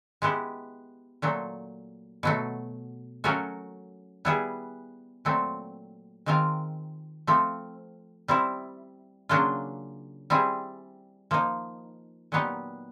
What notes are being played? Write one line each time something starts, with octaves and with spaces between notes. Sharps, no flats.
G#3 B3 E4 G4
A#2 F#3 A3
B2 F#3 A3
F#3 A3 C#4 F#4 A#4
G3 B3 E4 G#4
A#2 F#3 A3 C4
D#3 G#3 C4 F4 A#4
F3 A3 C4
G3 C4 E4
C#3 F#3 A#3 D4 F4
G3 C4 E4 G#4
F3 A#3 D#4
A#2 F#3 B3 D#4 G4